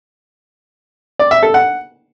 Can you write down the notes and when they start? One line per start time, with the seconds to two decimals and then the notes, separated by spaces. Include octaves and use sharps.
1.19 D5
1.31 E5
1.43 A4
1.54 F#5